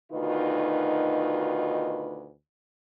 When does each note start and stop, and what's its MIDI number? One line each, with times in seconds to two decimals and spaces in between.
0.12 2.31 38
0.12 2.31 47
0.12 2.31 51
0.12 2.31 63
0.12 2.31 65
0.12 2.31 71